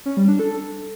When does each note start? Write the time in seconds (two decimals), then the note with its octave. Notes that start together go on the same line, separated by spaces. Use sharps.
0.06 C#4
0.17 G3
0.28 D4
0.39 A4